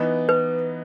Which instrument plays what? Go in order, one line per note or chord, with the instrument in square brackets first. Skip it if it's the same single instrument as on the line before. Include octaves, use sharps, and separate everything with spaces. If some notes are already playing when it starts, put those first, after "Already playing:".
Already playing: [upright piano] E3 B3 D#4
[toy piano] B4